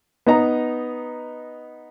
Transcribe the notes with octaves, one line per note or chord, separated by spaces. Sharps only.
B3 D#4 A#5